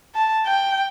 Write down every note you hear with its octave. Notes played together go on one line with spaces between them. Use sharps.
A5
G5